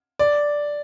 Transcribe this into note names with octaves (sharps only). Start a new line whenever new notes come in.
D5